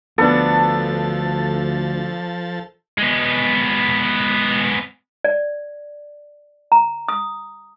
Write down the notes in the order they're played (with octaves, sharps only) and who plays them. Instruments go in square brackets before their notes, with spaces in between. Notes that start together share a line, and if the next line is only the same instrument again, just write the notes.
[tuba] D2 [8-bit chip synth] F3 A6 [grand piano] B3 D4 [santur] A4
[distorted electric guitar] G#3 B3
[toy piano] D5
A#5
D#6